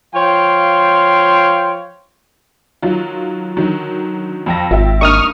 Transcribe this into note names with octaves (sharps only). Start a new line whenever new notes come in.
F3 C#5 F5 G5 C6
D#3 F#3 F4
D3 D#3 F#3
F2 G5 A#6
G#1 F4 E5 G5
G2 A#3 D#4 C#6 D#6 F6